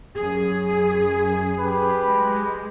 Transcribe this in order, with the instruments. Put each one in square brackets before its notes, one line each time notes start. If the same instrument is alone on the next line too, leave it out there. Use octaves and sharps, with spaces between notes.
[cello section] F#2 G#4
[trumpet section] G4 B4 B5
[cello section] G#3